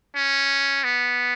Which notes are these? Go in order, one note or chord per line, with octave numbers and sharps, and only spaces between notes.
C#4
B3